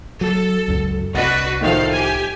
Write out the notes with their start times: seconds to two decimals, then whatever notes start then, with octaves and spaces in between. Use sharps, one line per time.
0.21 F#3 A4
0.68 C#2 F#2
1.15 C2 D4 F#4 B4 D#5 F#5 A6
1.61 A2 D#3 F3 A4 F5
1.91 G4 G#5